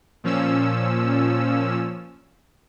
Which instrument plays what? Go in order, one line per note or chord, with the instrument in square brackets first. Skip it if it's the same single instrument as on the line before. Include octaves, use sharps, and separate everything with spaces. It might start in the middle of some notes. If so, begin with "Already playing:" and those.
[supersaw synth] A#2 F3 C#4 E6